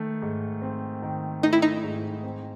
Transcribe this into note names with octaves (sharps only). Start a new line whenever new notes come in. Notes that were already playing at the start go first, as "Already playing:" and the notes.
Already playing: D#3 A3
G#2
C4
D#3
A3 D#4
E4
D#4
G#2
C4